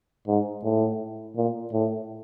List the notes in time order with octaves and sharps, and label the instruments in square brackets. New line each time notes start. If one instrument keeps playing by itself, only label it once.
[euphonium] G#2
A2
A#2
A2